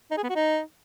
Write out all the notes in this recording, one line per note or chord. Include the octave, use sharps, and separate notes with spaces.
D#4
G#4
B3
F#4
D#4